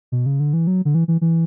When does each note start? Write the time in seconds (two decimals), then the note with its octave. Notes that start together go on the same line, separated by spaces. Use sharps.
0.12 B2
0.26 C#3
0.40 D3
0.53 E3
0.67 F#3
0.85 D3
0.95 E3
1.08 E3
1.21 E3